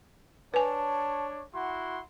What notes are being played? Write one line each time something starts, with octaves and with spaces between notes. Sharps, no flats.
D4 B4 C#5 G#5 A5
E4 F#4 F#5 C6